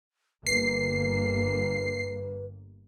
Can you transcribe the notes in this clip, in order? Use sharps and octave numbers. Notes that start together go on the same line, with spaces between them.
G1 A#3 B4 C7